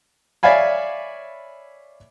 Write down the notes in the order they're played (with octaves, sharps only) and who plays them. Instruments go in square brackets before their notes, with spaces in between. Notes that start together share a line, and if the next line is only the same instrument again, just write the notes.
[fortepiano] C#5 D5 E5 F5 G#5 B5